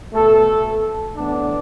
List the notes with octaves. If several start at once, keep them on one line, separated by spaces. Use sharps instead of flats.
B2 A3 A4
A2 E3 B3 D4